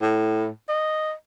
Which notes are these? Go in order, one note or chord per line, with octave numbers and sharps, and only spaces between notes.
A2
D#5